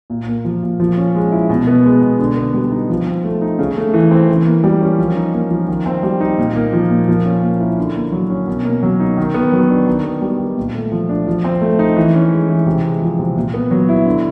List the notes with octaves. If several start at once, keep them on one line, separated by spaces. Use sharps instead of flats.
A#2
A#3
F3
A#2
F3
C#4
G#3
E4
B2
B3
G#3
B2
D3
B3
G3
D#4
F3
C4
A3
D#4
C#3
A3
E3
C4
E3
A#3
G3
C#4
F3
D#4
A#3
F3
D#3
C4
G3
D#4
A#2
A#3
F3
A#2
F3
C#4
A#3
E4
D3
A#3
F#3
C#4
B2
A#3
F#3
D#4
D#3
B3
F#3
D4
D#3
B3
G3
D#3
A#2
A3
F3
D4
F3
C4
A3
D#4
E3
C#4
G#3
E3
C3
G#3
F3
C3
A#2
B3
F#3
E4
D3